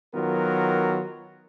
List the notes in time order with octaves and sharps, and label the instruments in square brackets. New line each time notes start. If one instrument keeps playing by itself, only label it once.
[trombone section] D#3 F#3 B3 F4 A#4